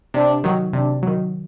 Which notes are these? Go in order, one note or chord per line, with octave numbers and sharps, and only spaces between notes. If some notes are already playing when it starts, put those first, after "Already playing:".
C3 D4
D#3 F#3
C3 D4
D#3 F#3